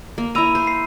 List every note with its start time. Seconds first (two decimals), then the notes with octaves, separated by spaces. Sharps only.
0.18 A#3
0.35 E4 A#5 B5 E6 D#7
0.55 C5
0.67 C7